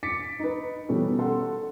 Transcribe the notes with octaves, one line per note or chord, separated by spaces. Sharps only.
D6 A6 B6 C#7 D7
D#4 B4
B2 E3 G3 B3 C#4 A4
A4 F#5 C6